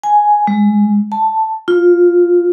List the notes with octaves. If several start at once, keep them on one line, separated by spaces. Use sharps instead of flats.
G#5
G#3
A5
F4